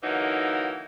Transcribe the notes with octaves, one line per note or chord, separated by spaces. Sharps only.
D3 E3 F#3 A#3 D#4